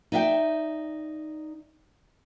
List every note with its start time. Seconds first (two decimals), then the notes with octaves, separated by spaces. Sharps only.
0.12 D#4 D5 E5 F5 G5